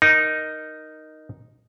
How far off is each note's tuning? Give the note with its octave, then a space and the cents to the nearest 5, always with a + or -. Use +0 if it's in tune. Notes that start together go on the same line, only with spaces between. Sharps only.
D#4 -5 A#4 +10